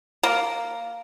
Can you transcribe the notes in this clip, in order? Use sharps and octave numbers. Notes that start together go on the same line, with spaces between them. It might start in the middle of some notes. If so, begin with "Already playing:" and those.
A#3